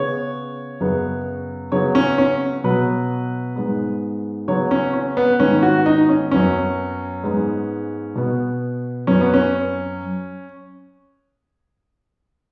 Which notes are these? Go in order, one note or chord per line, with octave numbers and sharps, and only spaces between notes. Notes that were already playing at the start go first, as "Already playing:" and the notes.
Already playing: C#3 B3 C#5
F#2 C#3 B3
C#3 F#3 B3 C#5
C#4
C#4
B2 F#3 B3 B4
G#2 G#3 B3
C#3 F#3 B3 C#5
C#4
C#4
B3
G#2 D#3 B3 C#4
F#4
D#4
C#4
F#2 F#3 B3 C#4
G#2 G#3 B3
B2 B3
F#2 F#3 B3 C#4
B3
C#4